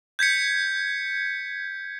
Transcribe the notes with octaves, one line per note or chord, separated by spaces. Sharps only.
G6 G#6 B6 C#7